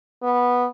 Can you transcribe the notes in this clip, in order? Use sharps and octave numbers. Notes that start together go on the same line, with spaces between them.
B3